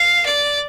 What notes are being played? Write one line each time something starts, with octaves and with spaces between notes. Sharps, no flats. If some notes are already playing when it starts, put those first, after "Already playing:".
Already playing: F5
D5